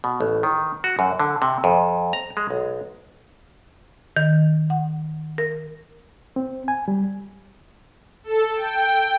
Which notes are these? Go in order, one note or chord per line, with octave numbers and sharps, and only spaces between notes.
B2
A1
D#3
F#4
F#2
D3
C3
F2
A#5
G#3
B1
D#3
F#5
A#4
C4
G#5
G3
A4
G5